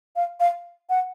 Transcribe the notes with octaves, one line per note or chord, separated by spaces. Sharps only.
F5
F5
F#5